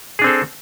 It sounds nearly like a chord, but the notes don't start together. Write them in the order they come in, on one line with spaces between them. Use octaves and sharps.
G#4 D4 C4 A4